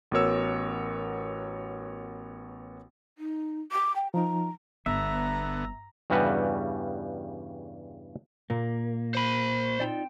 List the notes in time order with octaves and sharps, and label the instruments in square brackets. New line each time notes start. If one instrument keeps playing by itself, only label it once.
[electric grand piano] A1 B3 F#4 A#4 C#5 E6
[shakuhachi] D#4
D6
G5
[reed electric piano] F3 D#4 [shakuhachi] A#5
[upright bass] G1 [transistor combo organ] D3 B3 [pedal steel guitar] E5 [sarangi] A#5
[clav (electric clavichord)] E2 G2 C#3 G3 F#4 B4
[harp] A#2 [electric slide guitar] A#3
[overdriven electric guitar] C5 B5
[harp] C4 G5 E7 [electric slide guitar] D#4 F4 D5